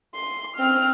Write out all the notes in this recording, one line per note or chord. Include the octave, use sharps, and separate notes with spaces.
C6
C4 F6